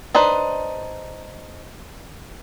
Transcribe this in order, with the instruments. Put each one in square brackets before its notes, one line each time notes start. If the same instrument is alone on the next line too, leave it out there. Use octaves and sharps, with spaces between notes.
[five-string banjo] D4 D#4 B4 C5